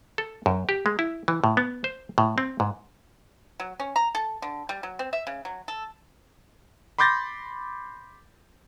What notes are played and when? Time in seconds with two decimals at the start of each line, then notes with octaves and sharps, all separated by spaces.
0.18 A4
0.46 F#2
0.69 G4
0.86 G#3
0.99 E4
1.28 E3
1.44 A2
1.57 B3
1.84 C5
2.18 A2
2.38 C4
2.60 G#2
3.60 F#3
3.80 C#4
3.96 A#5
4.15 A4
4.42 D3
4.69 G3
4.83 F#3
4.99 C4
5.13 E5
5.27 C#3
5.45 F#3
5.68 A4
6.99 B5 C6 D6 G6 A6 A#6